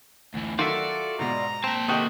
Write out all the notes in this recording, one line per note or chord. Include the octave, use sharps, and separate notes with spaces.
D2 E3
D#3 F#3 F4 F#4 A4 D5 E5
G#2 B2 A#5
A#3 C4 A5
C3 D#3 F#4 G4 D#5 G5 D#6